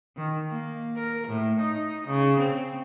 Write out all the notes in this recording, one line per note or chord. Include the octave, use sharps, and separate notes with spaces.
D#3
A#3
A#4
A2
D#4
C#3
C4